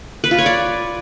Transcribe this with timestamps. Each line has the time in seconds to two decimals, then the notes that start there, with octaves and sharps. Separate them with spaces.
0.24 B4
0.31 F4
0.39 C#5
0.46 D5